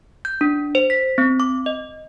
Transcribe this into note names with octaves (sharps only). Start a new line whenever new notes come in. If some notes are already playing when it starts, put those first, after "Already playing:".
G6
D4
C5
B6
C4
D6
D#5